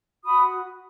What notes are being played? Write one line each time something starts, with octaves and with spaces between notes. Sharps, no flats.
F#4 B5 D#6